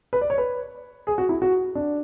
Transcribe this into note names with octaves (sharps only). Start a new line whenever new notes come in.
B4
D5
C#5
B4
G#4
F#4
E4
F#4
D4